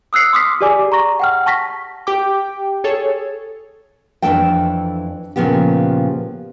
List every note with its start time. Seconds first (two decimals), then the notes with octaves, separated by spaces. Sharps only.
0.13 D#6 E6 F#6 C7 C#7
0.33 C6 D6 D#6 F6 B6
0.61 G4 G#4 D5 G#5 D6
0.92 A#5 C6 C#6 A#6
1.20 F#5 G5 F6
1.46 A5 C#6 A#6 B6
2.07 G4 G5 D6
2.84 G#4 A4 C#5
4.22 F2 E3 A3 D4 A4 G5
5.36 A#2 C#3 F3 B3 G4